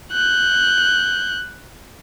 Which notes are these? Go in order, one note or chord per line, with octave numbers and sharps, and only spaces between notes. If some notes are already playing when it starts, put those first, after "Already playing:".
F#6 G6